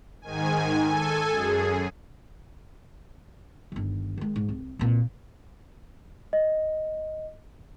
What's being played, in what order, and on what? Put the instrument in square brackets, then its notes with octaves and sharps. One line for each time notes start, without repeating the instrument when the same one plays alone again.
[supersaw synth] G#2 D#3 G#5
A4 G#5
F#2 G#4
[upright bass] G1 D#3
D#3 G#3
G#2
C2
C2 A#2
[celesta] D#5